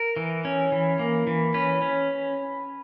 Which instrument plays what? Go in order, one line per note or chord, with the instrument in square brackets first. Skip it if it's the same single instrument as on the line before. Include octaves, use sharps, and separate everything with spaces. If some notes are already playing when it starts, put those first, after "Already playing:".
Already playing: [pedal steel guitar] A#4
E3
C#4
E3
A#3
E3
C#4 B4
C#4